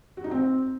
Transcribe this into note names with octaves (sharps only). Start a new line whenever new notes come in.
F#4
D#4
C4